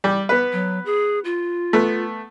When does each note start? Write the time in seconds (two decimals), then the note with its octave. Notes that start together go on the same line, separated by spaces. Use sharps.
0.04 G3
0.29 B3 B4
0.52 F#3
0.86 G#4
1.25 F4
1.73 A3 B3